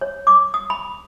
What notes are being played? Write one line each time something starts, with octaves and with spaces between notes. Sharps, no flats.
C#5
D6
D#6
B5